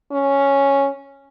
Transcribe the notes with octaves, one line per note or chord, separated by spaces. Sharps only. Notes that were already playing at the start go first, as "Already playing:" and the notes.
C#4